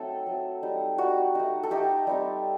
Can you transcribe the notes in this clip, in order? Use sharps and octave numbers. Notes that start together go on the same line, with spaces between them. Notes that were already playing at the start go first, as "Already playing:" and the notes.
Already playing: F#3 A3 C4 D#4 A4
F#3 A3 C4
G3 D#4
G3 D#4 F#4
A3 D#4
A4
A3 D#4 G4
G3 C4 D#4